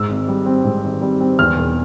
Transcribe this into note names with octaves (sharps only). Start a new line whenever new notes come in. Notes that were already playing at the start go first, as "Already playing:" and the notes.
Already playing: G#2 E6
G#1
G3
C4
G#2
G#1
G3
C4
E2 F6
E1